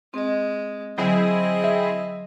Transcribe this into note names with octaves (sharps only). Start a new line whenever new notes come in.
G#3 C4 D#5
D3 F#3 C4 E4 G#4 D#5
E5